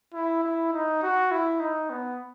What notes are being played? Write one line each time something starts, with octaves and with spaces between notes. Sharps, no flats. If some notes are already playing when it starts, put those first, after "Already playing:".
E4
E4
D#4
F#4
E4
D#4
B3